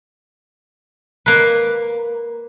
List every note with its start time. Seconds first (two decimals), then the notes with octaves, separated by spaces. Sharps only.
1.26 A#3 B4